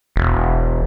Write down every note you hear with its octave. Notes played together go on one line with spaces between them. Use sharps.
E1